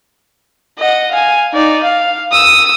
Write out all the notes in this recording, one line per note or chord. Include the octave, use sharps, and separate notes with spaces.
D#5 F#5
F5 G#5
D#4 D5
F5
D#6 E6